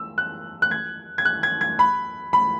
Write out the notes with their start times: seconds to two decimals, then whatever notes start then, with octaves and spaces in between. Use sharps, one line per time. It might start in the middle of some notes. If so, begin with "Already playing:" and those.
Already playing: E6
0.18 F#6
0.62 F#6
0.71 G#6
1.18 G#6
1.25 F#6
1.43 G#6
1.61 G#6
1.79 B5
2.33 B5